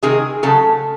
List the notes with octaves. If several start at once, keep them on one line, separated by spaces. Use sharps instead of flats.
C3 D#3 G#3 G#4
C#3 F#3 A3 A4